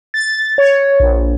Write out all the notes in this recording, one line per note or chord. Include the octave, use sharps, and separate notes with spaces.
A6
C#5
A#1